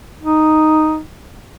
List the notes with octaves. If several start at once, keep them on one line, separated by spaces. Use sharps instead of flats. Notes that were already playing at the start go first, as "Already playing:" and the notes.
D#4